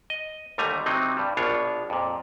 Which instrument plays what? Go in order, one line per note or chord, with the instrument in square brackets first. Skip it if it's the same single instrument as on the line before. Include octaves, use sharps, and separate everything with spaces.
[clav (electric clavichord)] D#5
D#2 D3 G3 A3 G#5 A#5
C3 F#3 C4 D#4
G2 G3
A#1 B2 D4 F4 C#5
F2 A#2